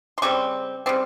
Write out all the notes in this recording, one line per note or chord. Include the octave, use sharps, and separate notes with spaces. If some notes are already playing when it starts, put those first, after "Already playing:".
C6
C#3 G3 C4 C#6
C#3 G3 C4